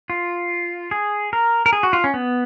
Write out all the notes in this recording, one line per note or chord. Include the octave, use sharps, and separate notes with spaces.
F4
G#4
A#4
A#4
G#4
F#4
F4
C#4
B3